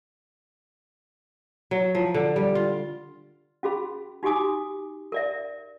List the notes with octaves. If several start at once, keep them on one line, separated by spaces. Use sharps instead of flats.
F#3
F3
D3
G3
F4
C#4 F#4 G#4 B5
D#4 F#4 G4 G#5 D6 D#6
A#4 D5 E5